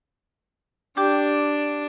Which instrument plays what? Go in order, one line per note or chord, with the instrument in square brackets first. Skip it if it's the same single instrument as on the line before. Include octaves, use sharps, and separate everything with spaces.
[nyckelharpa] D4 [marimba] G4 G5 D6